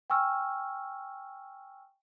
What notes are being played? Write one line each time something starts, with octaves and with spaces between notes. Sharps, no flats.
G5 G#5 C#6 E6 F6